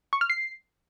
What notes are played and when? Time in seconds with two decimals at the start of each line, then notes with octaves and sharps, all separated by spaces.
0.13 C#6
0.21 F6
0.30 C7